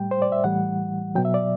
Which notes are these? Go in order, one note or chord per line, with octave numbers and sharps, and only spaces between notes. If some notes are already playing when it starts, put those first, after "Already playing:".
Already playing: A2 G3 G5
C5
D5
E5
A2 E3 G3 F#5
B2 F#3 G5
E5
D5